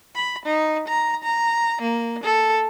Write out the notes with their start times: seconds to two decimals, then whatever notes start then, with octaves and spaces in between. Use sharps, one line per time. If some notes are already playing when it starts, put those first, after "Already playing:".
0.16 B5
0.45 D#4
0.88 A#5
1.23 A#5
1.81 A#3
2.23 A4